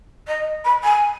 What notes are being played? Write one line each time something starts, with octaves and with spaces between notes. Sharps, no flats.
D#5
B5
G#5